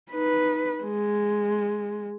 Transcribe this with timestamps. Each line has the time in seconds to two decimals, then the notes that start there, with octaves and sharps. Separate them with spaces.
0.12 D#4 B4
0.83 G#3